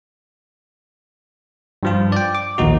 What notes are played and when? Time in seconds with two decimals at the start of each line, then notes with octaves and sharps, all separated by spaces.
1.83 G2 F3 F4
2.12 D5 G5
2.35 D6
2.58 A#1 D#2 D#4 F#4